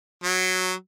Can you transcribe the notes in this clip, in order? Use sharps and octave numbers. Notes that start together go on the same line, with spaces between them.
F#3